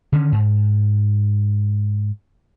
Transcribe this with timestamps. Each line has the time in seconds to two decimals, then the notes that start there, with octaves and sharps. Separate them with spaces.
0.12 D3 D#3 C#4
0.32 G#2